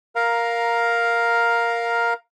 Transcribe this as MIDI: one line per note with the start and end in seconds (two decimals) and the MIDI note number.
0.16 2.14 70
0.16 2.14 77
0.16 2.14 82